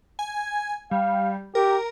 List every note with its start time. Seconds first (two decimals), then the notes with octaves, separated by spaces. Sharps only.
0.19 G#5
0.91 G3 F5
1.55 G4 A#4